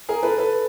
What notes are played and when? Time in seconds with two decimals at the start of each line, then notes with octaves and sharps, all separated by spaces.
0.09 G#4 A#4
0.23 A4 B4
0.38 A4 B4